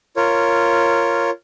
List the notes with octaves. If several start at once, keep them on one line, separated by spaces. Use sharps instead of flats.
F4 A#4 C#5